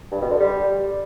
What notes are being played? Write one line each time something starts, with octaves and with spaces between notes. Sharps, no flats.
G2
B2
D3
G3